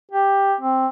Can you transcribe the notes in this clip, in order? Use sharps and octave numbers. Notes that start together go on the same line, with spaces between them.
G4
C4